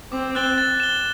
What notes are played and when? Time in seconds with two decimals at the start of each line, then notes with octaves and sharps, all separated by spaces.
0.12 C4 D6
0.35 F#6 A6 E7 G7
0.58 A6
0.80 E7 G7